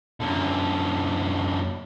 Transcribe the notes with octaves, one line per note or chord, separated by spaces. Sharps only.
F#2 D3